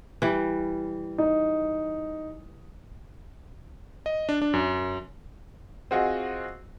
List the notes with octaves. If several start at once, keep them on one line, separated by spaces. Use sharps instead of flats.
E3 G3
D#4
D#5
D4
D4
F#2
C4 F4 F#4 G#4 D#5 F#5